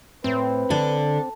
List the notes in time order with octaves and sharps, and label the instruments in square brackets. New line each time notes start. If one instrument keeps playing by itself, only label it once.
[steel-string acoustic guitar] A2 [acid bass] C4 [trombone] B4
[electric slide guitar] D3 D4 [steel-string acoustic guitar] A4